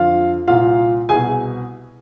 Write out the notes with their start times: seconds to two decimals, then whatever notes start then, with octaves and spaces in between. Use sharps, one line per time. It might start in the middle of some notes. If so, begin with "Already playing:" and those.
Already playing: F2 D3 F4 F5
0.48 C2 A#2 F4 F5
1.09 C2 B2 G#4 G#5